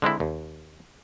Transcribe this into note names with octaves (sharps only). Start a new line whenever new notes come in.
D3 G#3 C4 E4
D#2